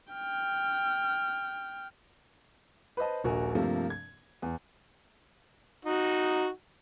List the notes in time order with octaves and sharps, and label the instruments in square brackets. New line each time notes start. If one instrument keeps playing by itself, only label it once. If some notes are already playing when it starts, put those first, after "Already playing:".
[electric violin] G5 F6
[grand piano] B4 C5 D#5 A5
D#1 A#1 F#4 A#4 G#5
G2 C3 F3 A3 A#3
G#6
E2
[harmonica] D#4 F#4